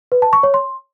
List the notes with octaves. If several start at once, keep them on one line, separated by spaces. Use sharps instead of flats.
B4
A5
C#6
C#5
C6